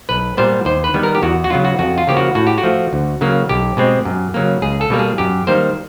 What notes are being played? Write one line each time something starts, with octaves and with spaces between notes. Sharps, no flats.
B1 B4
A#2 G3 B3 C5
D#2 C5
B4
D#3 G3 B3
A#4
G4
E2 F#4
F#4
C#3 F#3 B3 F4
F#4
F2 F#4
F4
C#3 F3 A#3 G4
F#4
A2 F#4
G4
F#4
F3 A3
D2
C#3 F#3 A#3
B1 G4
B2 G#3 C4
F#2
C#3 F#3 A#3
C#2 G#4
A4
B2 G3 A#3
G#4
F#2 G4
D#3 G3 A#3 C5